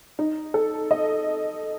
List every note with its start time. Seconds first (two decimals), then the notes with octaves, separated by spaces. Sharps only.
0.19 D#4
0.54 A4
0.91 D#5